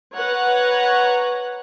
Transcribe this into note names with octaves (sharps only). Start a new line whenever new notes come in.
B4 C#5 F#5 A#5